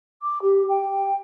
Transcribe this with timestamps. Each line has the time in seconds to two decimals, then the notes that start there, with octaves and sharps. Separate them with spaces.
0.22 D6
0.42 G4
0.68 G5